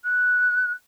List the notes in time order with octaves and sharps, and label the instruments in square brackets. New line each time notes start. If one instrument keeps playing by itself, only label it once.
[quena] F#6